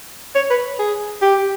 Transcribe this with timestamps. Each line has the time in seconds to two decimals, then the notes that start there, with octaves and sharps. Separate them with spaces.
0.36 C#5
0.51 B4
0.79 G#4
1.22 G4